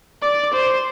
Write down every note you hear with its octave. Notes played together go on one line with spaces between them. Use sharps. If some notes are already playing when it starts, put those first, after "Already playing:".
D5
C5